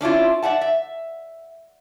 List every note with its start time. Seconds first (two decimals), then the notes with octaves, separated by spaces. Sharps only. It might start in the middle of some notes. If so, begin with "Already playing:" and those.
0.01 C#4 D4 E4 F4
0.42 D5 E5 F#5 A5
0.61 E5